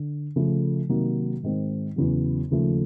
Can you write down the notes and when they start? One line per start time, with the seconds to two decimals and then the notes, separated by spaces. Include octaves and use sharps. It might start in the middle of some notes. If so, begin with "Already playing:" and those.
Already playing: D3
0.36 C#3 F3 A3
0.89 C3 D#3 F#3 A#3
1.43 G#2 D#3 G#3 C4
1.96 E2 C#3 F#3
2.51 D#2 C#3 F3 A3